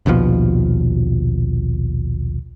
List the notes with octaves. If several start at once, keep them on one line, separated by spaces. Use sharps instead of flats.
A#1 D#2 B2 F3